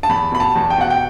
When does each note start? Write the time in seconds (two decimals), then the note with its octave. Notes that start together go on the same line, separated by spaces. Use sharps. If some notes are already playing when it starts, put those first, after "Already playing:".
0.03 A5
0.09 E2 B5
0.32 B2 B5
0.40 A5
0.55 E2
0.70 G5
0.78 B2 F#5
0.90 G5